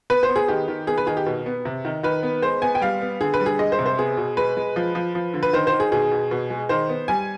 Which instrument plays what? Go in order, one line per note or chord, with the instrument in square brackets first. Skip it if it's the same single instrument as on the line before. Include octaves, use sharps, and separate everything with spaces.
[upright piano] B3 B4
C5
B3
G#4
D#3 G4
D#3
B3 G#4
B4
D#3 G#4
G4
B2
B3
C3
D#3
D#3 B4
B3
G#3 C5
B3 G#5
G5
G3 F5
B3
D3 G#4
B4
G3
G#4
G#3 D#5
C5
C3
C5
B3 G#4
B2
G#3 B4
G#3
F3
F3
F3
D3
B4
D#3 C5
C5
D#3
G#4
B2 G#4
B2
B2
G#3
D#3 C5
B3
G3 G#5